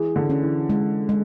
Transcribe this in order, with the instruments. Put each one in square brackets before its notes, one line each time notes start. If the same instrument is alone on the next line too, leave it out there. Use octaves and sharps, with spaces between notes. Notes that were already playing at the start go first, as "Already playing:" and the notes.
Already playing: [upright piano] E3 [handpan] G#4
[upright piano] D3
[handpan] C#4
[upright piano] E3
[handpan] G#3
G#3